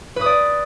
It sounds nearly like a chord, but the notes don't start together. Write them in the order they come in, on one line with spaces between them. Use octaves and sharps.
B4 D#6 D5